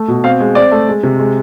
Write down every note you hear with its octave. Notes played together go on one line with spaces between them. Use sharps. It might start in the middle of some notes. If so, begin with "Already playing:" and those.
Already playing: A3
B2
C4 F5
G#3
C4 D5
A3
G#3
C3
G#3